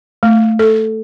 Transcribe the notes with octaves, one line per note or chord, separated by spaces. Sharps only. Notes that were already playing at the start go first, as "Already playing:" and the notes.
A3
A4